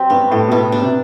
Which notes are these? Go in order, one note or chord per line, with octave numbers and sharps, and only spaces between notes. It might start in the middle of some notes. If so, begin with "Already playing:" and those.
Already playing: F#3 C4 G4
G2 B3
A2 G4
B2
A2 B3
B2 D4
C3